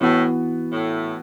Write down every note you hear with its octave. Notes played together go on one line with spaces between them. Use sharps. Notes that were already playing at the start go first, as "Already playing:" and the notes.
A2 E3 B3 F#4
A2